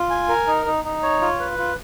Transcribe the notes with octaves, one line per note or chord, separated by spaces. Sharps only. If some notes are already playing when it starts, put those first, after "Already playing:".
Already playing: F4
G#5
A#4
D#4
D#4
D#4
C#5
F4
B4
F4